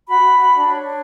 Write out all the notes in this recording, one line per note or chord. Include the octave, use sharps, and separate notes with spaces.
F#4 B5
F#4
F#4
D4
C#5
D4